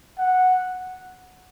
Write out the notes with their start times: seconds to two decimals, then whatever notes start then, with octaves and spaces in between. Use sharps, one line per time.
0.19 F#5